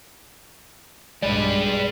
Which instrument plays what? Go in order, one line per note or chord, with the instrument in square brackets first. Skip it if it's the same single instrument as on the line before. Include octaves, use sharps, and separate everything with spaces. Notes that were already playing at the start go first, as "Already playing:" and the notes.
[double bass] B1 G2 [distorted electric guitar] G3 B4 [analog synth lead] G#3 [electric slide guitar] D5